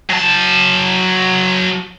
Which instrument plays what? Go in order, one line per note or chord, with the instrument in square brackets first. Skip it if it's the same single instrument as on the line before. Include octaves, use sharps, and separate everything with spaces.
[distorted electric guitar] F#3 A5